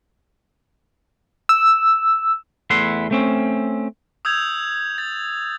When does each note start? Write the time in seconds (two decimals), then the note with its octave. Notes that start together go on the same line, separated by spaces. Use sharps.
1.49 E6
2.70 E2 A3 E4 F#5 C6
3.11 A3 C4 C#4
4.25 D#6 E6 G6 G#6 F7
4.98 A6